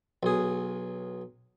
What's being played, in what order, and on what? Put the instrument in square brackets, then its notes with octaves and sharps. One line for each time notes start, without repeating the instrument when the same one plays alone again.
[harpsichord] B1 G#4